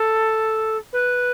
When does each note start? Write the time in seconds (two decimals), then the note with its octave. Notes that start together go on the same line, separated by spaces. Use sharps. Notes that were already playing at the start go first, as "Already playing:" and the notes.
Already playing: A4
0.92 B4